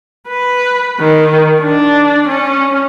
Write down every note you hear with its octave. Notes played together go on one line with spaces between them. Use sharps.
B4
D#3
D4
C#4